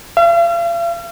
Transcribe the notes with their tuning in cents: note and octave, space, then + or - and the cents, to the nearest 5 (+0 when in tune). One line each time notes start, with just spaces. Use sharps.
F5 -45